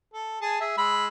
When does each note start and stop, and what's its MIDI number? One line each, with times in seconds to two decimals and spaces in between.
0.14 0.41 69
0.42 0.59 68
0.42 0.59 80
0.42 0.59 81
0.61 0.76 68
0.61 0.76 76
0.78 1.08 56
0.78 1.08 83
0.78 1.08 88